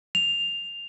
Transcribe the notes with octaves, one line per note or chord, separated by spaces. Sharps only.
F7